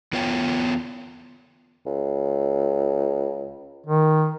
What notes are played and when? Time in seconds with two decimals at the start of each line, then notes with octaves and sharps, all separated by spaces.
0.12 E2 B3 F4 C#5 G5
1.86 C#2
3.86 D#3